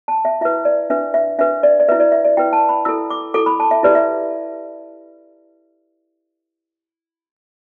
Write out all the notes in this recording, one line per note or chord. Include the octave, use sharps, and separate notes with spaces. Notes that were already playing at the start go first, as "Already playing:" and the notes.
A5
E5
E4 B4 E5
D5
D4 B4 E5
E5
D4 B4 E5
D5
D5
E4 B4 E5
D5
E5
D5
E4 B4 G5
A5
B5
E4 A4 E6
D6
E4 A4 D6
B5
A5
E5
E4 G4 B4 D5
E5